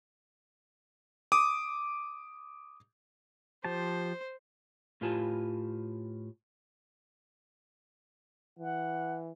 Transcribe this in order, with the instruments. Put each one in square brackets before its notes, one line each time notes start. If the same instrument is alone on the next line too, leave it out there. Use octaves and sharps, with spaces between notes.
[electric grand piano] D6 D#6
[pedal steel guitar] F3 G4 A5 [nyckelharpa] C5
[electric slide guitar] A2 F4 G4 B4 G#5 A5
[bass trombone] E3 [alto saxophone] F#5